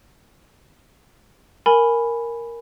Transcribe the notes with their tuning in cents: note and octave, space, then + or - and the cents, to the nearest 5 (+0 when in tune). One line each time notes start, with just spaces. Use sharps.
A#4 +0 G#5 +0 B5 +0